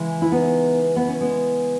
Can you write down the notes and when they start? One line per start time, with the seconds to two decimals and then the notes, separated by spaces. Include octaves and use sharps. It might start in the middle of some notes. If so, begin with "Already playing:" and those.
Already playing: C#3 E3 G#3
0.22 E4
0.32 B3 D#4
0.96 B3
1.08 C#4
1.21 G#3 B3